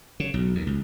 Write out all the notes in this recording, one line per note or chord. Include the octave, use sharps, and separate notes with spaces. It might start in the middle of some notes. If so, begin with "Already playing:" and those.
C#3
B1
D#2
C#2